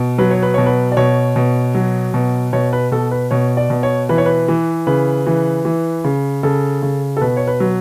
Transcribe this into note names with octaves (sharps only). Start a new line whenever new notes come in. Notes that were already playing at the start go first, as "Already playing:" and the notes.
Already playing: B2
F#3 B4
C#5
B4
B2 C#5
B4
D5
B2 C#5
B2
F#3
B2
B2 C#5
B4
B2 A4
B4
B2 C#5
D5
B2
C#5
E3 B4
C#5
B4
E3
C#3 B4
E3
E3
C#3
C#3 A4
C#3
A4
B2 B4
C#5
B4
F#3